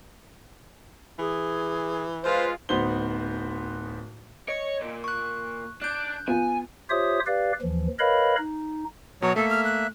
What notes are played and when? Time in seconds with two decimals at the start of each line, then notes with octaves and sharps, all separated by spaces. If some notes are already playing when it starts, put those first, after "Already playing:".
1.19 E3 G#4
2.24 G#3 F4 B4 C5
2.69 D1 B3 D#4 F#4 C5 G7
4.48 C#5 D#5 C#7
4.81 A#2
5.04 C#6 F#6
5.82 D4 F#6 G6
6.28 B3 F4 G#5
6.90 F4 G4 C5 C#5 E5 D#6
7.26 G4 B4 D5 F5
7.61 D#2 E3 F3
7.99 A#4 B4 C#5 D#5 F5 B5
8.38 D#4
9.22 B2 F#3 C#5 A#5
9.36 A3 A#3 A4 E5
9.50 F6
9.65 F#6